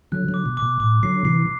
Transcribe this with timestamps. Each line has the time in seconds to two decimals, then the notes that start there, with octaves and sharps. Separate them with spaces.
0.12 D3 F#3 F#6
0.29 D3 F#3
0.34 D6
0.46 B2
0.57 D6
0.62 B2
0.80 A2 D6
1.03 D3 F#3 C7
1.25 C3 E3 C7